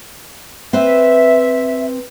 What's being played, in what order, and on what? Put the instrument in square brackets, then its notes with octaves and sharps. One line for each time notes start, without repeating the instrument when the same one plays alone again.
[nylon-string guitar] C4 B4 C5 [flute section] E5